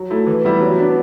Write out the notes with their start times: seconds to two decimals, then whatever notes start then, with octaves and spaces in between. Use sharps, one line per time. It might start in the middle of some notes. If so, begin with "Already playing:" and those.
Already playing: F#3
0.10 A3 E4
0.27 E3
0.45 G3 B3 E4
0.61 F#3
0.78 B3 D4